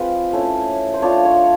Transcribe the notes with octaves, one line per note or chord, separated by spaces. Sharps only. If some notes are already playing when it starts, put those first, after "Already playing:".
Already playing: G#3 C4 F4 B4
A3 C#4 E4
C5
A3 D4 F4 C#5
C#5